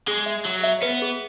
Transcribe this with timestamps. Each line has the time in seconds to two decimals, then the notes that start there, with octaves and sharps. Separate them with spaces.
0.08 G#3 G#4
0.26 E5
0.46 F#3 G#4
0.64 E5
0.82 B3 B4
1.02 G#4